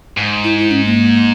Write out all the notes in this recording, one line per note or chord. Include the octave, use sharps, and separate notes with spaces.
G#2
E4
E4
C#4
A#3